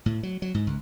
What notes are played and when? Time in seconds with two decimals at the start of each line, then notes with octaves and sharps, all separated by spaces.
0.06 A2
0.23 F#3
0.42 F#3
0.54 G#2
0.67 C#2